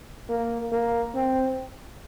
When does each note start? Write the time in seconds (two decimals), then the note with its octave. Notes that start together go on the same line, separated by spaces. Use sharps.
0.29 A#3
0.72 A#3
1.15 C4